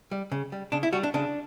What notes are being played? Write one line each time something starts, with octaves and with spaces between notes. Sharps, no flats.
G3
C#3
G3
C#3 D4
E4
G3 F#4
D4
C#3 D4